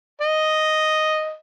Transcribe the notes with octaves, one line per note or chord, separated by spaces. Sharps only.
D#5